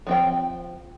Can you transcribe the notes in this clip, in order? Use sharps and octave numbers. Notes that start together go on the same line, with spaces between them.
F3 C4 G5